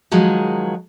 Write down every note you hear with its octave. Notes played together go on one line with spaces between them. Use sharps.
D#3 F3 F#3 G#3